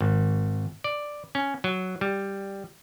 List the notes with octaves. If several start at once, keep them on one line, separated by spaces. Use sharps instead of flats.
G#1
D5
C#4
F#3
G3